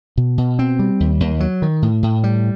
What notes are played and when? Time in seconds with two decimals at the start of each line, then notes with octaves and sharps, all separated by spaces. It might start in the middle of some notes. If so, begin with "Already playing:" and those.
0.17 B2
0.38 B2
0.59 C4
0.79 G3
1.00 D#2
1.20 D#2
1.40 F#3
1.62 D#3
1.82 A2
2.03 A2
2.24 G3